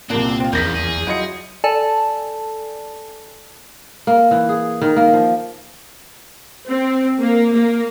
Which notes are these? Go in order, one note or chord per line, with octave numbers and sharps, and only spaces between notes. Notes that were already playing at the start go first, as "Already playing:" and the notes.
C2 A#2 C#3 A#3 C4 D4
C4 F4
E2 C#3 F3 A#3 G6 A#6 B6
G#4
F#3 E4 F4 D#5 C#7
A4 D5 G#5 A5
A#3
E3
G#4
D#3
A#3
F3
C4
A#3
A#3